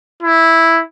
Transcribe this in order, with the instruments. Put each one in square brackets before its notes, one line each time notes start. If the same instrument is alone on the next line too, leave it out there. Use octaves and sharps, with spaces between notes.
[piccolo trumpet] E4